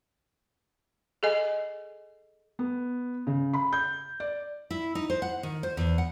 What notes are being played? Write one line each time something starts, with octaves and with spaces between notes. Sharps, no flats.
G#4 A4 D#5 G#5
B3
C#3
B5
G6
D5
E4
D#4
C5
F#5
D#3
C5
E2
F#5